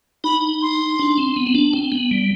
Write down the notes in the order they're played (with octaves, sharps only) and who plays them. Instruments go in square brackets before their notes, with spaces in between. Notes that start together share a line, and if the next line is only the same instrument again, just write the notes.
[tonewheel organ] D#4 [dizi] B5
[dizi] C6
[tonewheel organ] D4
C4
B3
C4
D4
C4
B3
G3